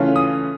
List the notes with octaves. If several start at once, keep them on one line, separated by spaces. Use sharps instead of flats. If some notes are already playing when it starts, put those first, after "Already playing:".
Already playing: C#3 E3 A3 C#4 F4
D#6